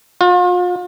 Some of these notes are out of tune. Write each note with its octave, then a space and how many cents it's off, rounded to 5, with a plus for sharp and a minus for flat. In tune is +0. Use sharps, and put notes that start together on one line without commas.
F4 +40